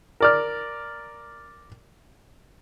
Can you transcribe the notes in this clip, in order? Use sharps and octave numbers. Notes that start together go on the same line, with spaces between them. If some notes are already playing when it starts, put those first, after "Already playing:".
A#4 D5 F6